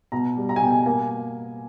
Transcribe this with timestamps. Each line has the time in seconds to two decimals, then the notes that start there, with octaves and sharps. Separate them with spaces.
0.12 B2 A#5
0.37 G3
0.49 A#5
0.56 G#5
0.61 B2 G5
0.71 G#5
0.86 A#3 G#5